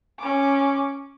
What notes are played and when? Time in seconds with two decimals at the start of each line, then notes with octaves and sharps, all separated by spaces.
0.19 C#4 D6